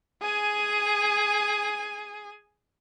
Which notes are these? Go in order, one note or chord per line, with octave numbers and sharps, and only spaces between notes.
G#4 G#5